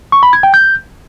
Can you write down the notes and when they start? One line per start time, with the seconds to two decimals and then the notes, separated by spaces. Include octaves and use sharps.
0.12 C#6
0.23 B5
0.33 G#6
0.43 G5
0.54 G6